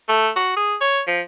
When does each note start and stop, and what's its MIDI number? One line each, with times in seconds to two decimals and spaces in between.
0.09 0.30 57
0.36 0.55 66
0.57 0.75 68
0.81 1.02 73
1.07 1.21 53